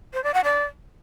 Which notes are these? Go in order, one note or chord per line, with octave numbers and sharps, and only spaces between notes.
C5
D5
F#5
D5